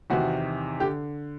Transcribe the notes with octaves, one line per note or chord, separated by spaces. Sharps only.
E2 C3 D#3 F#4
D3 G4